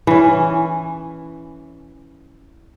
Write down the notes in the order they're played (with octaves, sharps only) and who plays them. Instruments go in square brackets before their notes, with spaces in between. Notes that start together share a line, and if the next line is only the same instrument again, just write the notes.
[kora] E3 C#4